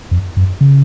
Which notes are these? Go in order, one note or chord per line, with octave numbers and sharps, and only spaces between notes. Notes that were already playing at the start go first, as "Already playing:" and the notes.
F2
F#2
C#3